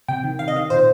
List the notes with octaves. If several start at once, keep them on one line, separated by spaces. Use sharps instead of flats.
C3 G5
D#3
C3 F5
D#5
D#3 F5
A#2 C5